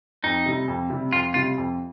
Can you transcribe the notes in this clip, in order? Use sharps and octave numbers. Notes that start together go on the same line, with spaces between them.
F2 D#4
C3 G3
F2
C3 G3
F2 F4
C3 G3 F4
F2